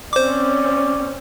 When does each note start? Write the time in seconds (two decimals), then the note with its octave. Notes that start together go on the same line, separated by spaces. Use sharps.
0.13 C4 C#4 C5 D5 D6